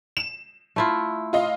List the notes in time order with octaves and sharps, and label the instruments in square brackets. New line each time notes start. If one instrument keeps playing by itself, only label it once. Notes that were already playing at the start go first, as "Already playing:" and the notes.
[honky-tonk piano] E7
[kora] A3 E4 F4
[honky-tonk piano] F4 D#5 F5